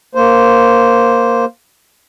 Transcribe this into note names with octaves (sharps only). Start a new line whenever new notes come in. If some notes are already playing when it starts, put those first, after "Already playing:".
A#3 C5